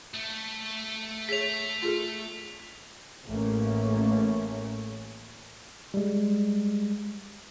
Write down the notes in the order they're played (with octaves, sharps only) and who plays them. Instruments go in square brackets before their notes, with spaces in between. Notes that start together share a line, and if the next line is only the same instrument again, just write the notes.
[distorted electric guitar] A3
[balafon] G#4 C#5 [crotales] B6 F7
[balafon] F4 G#4 A4
[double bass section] A1 A3 A#3 C#4
[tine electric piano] G3 G#3